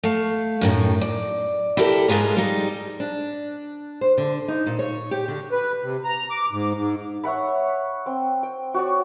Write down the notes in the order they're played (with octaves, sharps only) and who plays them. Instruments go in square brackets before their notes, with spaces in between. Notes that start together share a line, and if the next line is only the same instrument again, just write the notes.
[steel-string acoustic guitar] A3 F5
F#2 A2 D#3
D5
E4 G4 A4 A#4
G#2 G#3 F4 G#4 A#5
G3 D#4
D4
C5
D3
D#4
A#2
C#5
G4
D3
[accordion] B4
C3
A#5
D6
G#2
G#2
[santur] C#5 E5 F#5 B5
C4
G5
F#4 C#5 D5